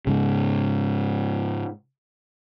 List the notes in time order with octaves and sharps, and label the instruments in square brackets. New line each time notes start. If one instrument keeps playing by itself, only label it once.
[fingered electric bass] G#2 C#3